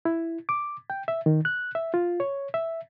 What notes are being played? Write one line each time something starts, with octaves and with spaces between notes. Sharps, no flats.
E4
D6
G5
E5
D#3
F#6
E5
F4
C#5
E5